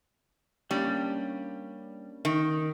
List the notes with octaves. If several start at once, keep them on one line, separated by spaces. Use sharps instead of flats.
G3 A#3 C#4 D4
D#3